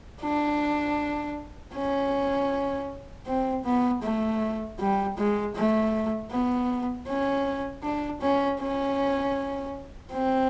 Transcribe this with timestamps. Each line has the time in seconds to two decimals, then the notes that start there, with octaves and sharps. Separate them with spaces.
0.22 D4
1.75 C#4
3.26 C4
3.64 B3
4.02 A3
4.79 G3
5.18 G#3
5.55 A3
6.31 B3
7.08 C#4
7.83 D4
8.21 C#4
8.60 C#4
10.12 C4